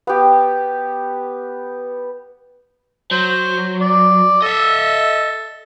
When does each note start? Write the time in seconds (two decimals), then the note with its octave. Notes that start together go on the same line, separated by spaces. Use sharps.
0.07 B3 G4
3.12 F#3 C5
3.81 D5
4.42 A4 D#5 E5